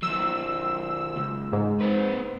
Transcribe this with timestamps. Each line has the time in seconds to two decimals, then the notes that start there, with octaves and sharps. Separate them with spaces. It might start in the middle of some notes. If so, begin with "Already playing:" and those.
0.03 D#3 F#3 E6
1.16 C#2
1.53 G#2
1.81 C4 B4